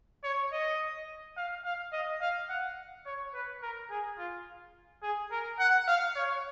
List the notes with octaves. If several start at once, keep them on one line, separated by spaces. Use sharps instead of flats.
C#5
D#5
F5
F5
D#5
F5
F#5
C#5
B4
A#4
G#4
F4
G#4
A#4
F#5
F5
C#5